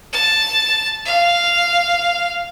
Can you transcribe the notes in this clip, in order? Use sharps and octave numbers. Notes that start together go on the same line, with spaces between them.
A5
F5